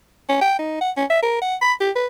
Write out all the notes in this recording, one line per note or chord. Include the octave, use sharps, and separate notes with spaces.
C#4
G5
D#4
F#5
C#4
E5
A#4
F#5
B5
G4
B4